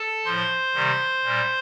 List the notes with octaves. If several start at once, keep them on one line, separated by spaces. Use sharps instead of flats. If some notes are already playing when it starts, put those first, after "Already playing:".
Already playing: A4 A5
A2 F3 C5 C6
C3 D#3 G3
A#2 G3